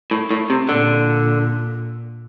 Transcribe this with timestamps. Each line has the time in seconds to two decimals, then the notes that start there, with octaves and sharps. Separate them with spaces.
0.11 A2
0.31 A2
0.50 C3
0.68 A#2 D3